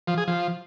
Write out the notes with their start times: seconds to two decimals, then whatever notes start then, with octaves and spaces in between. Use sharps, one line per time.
0.07 F3
0.18 G#4
0.28 F3